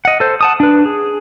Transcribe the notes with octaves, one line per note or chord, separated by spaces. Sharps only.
D#5 F#5
A4 C5
F#5 A5 D#6
D4 B4
G#4